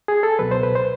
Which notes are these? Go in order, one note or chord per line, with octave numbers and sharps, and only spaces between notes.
G#4
A4
C#2 B2 F#3 B4
C5
B4
C5